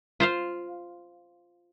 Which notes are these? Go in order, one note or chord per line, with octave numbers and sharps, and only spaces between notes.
F4 C5 F5